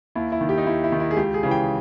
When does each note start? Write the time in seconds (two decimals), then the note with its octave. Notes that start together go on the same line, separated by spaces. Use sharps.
0.15 D#2 E4
0.32 E4
0.41 D#3
0.49 G4
0.58 D#4
0.66 D#2 E4
0.84 E4
0.92 D#3
1.00 E4
1.11 G#4
1.17 C#2 G4
1.34 G#4
1.43 C#3 E3
1.51 G5